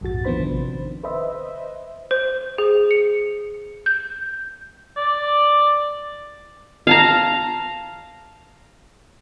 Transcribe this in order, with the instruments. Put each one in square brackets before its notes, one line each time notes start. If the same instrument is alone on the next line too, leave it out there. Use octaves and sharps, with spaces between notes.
[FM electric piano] A#1 F2 G#2 F#4 A6
D#3 F3 B3 D4 C5 B5
A1 C3 D#3
B4 C5 D#5 E5
[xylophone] C5
G#4
C#7
G6
[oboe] D5
[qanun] F5 A5 A#5